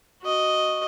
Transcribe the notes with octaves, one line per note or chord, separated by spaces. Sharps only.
F#4 D#5